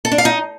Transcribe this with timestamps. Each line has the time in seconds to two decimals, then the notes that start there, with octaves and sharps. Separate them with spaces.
0.05 A4
0.11 D4
0.18 F5
0.25 D#4